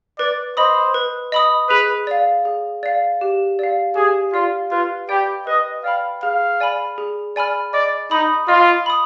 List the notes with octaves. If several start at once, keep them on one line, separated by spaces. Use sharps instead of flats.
B4 D5
C5 D#5 B5 D#6
B4
D#5 B5 D#6
G#4 B4
D5 F5
G#4
D5 F5
G4
D5 F5
G4 G#4
F4 D5 F5
F4 B4
G4 D5 G5 B5
B4 D#5
D5 F5 G5 B5
G#4 F5
D5 G#5 B5 F6
G#4
D5 G#5 B5 F6
D5 D#5
D#4 B5 D#6
F4 D#5
B5 D#6